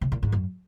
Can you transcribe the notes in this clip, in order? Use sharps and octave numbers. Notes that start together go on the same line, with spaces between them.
C3
A#2
G#2
F#2